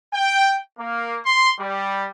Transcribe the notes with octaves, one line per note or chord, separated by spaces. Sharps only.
G5
A#3
C6
G3